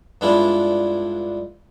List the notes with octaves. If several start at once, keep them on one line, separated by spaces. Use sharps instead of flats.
G2 G#3 B3 D4 E4 F4